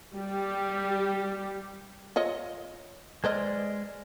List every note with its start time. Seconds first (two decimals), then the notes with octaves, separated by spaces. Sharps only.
0.15 G3 G4
2.16 F4 C#5 D#5
3.24 G#3 B4 C5 D5 D#5 F6